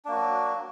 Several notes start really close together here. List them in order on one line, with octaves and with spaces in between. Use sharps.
D4 A#3 F#4 F#3